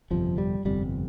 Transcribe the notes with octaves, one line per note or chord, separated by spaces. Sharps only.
G1 F2 C3 F3
G3
G1 F2 C3 G3